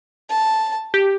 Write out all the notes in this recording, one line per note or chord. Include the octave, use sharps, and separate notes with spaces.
A5
G4